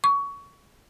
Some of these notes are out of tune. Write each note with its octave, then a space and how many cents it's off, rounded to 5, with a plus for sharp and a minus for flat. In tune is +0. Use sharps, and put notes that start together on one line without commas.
C#6 +20